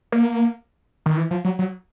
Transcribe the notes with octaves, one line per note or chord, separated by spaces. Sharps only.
A#3
D#3
E3
F3
F#3
F#3